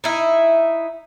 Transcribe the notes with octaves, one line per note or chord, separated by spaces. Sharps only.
D#4 E4